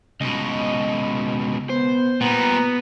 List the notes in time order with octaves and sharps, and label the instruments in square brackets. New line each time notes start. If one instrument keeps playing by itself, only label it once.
[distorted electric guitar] C#2 B2 [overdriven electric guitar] D#5
[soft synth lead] B3 [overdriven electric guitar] C5
[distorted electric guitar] A#2 G3 [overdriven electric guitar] B3 [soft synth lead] A#5